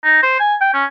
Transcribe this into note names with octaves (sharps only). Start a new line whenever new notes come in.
D#4
C5
G#5
G5
C#4